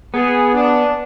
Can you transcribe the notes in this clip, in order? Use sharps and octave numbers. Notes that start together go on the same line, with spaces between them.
B3 G#4
D4